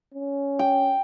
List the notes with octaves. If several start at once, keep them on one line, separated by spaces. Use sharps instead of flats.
C#4
G5